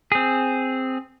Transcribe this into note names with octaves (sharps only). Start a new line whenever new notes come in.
C4 G#4